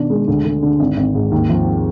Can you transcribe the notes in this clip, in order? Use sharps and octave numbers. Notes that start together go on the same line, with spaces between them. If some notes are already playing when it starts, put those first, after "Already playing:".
Already playing: B2 D#3 D4
G#3
D2
D2
D3
G#1
G#1
G#2
D#2
F3